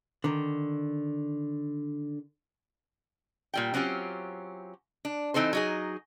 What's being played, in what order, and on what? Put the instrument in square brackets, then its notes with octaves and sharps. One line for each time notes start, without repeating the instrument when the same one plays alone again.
[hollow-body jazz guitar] D3 D#3
[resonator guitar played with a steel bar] A#2 G3 G5
F#3 C4 C#4 F4 G4
D4
E3 C4 D#4 A4 C5
F#3 D#4 G#4